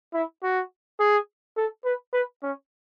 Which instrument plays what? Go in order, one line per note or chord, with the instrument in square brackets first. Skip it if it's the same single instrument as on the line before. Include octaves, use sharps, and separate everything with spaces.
[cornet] E4
F#4
G#4
A4
B4
B4
C#4